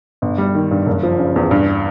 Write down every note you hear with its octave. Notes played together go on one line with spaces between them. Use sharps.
G1
G3
D#3
G2
F#1
F3
C#3
E2
G2